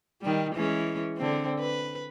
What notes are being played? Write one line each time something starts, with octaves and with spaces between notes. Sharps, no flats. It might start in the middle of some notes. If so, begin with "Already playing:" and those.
D#3 G3
E3 G#3 C#4
D3 C4
B4